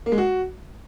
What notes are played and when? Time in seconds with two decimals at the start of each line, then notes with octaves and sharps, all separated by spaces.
0.06 A#3
0.12 G#3
0.18 F#4